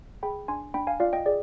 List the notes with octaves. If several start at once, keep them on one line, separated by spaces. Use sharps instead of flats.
G#4 G5 B5
D4 G#5 C6
D4 G5 B5
F5 G#5
F4 D5 F5
D#5 G5
G#4 D5